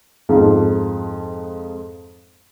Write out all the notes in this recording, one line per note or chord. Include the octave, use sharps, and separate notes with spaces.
F2 G#2 F3